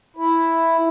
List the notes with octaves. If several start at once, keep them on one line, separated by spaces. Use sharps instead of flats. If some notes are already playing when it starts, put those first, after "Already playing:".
E4